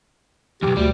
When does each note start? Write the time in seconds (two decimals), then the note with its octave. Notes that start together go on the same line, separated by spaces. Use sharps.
0.62 B1 E2 G4
0.77 D2 G3